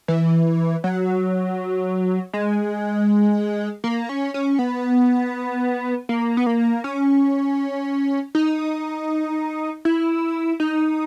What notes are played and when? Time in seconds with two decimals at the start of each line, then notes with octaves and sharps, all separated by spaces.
0.08 E3
0.84 F#3
2.33 G#3
3.84 A#3
4.09 C#4
4.34 C#4
4.59 B3
6.09 A#3
6.37 B3
6.46 A#3
6.84 C#4
8.35 D#4
9.85 E4
10.60 D#4